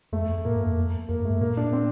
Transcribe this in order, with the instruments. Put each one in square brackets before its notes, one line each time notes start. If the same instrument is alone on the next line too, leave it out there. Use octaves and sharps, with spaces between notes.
[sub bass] F2 [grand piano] A3
[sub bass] F2
[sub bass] A2 [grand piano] A#3
[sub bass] G2
[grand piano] A#3
[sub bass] F2
[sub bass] F2 [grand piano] A#3
[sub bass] G2
[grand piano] A3
[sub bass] G2
[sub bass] A#2 [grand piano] A#3
[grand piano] D4
C4